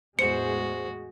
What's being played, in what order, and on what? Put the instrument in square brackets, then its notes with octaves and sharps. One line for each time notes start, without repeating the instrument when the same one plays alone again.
[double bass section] E2 A2 G#3 [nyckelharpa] F#4 G#4 [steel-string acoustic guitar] C5 [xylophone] C#7